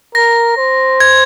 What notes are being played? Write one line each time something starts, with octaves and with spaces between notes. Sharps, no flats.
A#4 A#6
C5
G#6